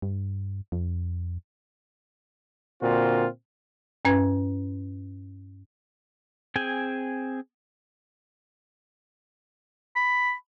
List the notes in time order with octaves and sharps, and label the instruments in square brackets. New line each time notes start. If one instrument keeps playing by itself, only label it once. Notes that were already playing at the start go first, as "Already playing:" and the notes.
[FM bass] G2
F2
[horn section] A#2 D3 C4 F4 F#4
[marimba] G2 C#4 B4 G#6
[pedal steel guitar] C4 G#4 G5 G#5
[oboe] B5